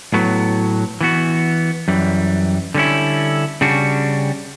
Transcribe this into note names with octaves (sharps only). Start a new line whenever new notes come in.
A2 F#3 B3
E3 B3 F#4
F#2 E3 G3
D3 G3 C#4 E4
C#3 G3 D4 F#4